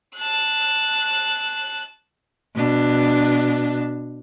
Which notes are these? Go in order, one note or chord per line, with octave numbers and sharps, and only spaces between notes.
A5 F#6
B2 D4